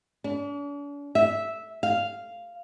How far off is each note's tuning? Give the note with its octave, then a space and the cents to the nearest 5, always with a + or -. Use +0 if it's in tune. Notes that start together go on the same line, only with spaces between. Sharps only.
D4 -45
E5 -5
F5 -5